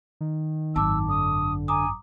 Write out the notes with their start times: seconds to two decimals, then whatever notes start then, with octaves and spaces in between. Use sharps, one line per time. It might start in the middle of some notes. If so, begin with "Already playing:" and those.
0.21 D#3
0.76 G#1 F#2 A5 D6 E6
1.08 D3 D#6
1.68 G#5 A#5 D6 D#6